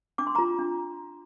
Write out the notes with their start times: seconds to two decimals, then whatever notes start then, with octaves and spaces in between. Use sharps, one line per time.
0.18 D4 D6
0.27 C6
0.35 F4 A#5 D6
0.58 D4